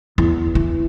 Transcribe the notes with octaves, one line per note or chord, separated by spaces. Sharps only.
E2
E3